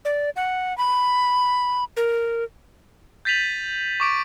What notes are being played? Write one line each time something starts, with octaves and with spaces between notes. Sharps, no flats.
D5
F#5
B5
A#4
G6 A6 B6 D#7 F7 F#7
C#6 D6 D7